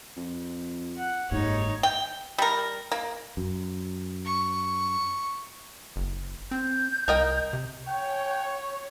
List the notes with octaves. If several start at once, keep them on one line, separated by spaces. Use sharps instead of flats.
F2
F#5
F#1 D#2 G#2 D#4 C#5
G5
G3 A#4
A#3
F#2
C#6
F#1
C4 G6
C2 A#4 D#5 G5
C3
C#5 G5